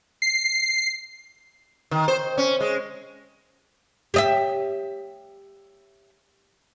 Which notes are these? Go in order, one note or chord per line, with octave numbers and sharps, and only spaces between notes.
C7
D#3
C5
C#4
G#3
G4 D#5 E5